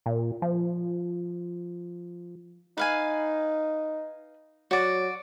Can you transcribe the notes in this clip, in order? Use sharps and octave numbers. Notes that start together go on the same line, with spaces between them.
A#2
F3
D#4 B4 F5 G#5
F#3 F#4 D5